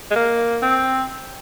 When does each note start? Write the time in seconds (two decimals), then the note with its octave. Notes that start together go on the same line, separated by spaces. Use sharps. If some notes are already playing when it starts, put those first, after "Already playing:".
0.11 G#3
0.16 A#3
0.62 C4